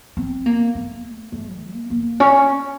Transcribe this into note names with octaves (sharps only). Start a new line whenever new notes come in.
C4
A#3
A3
A3
D#3
A#3
A#3
C#4